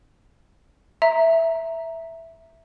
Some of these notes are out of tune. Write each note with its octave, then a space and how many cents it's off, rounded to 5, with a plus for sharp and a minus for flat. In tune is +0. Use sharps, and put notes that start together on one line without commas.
E5 +0 A#5 +0